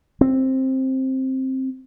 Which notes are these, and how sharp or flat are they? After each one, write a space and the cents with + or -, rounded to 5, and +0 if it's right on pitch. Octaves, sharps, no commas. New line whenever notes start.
C4 +10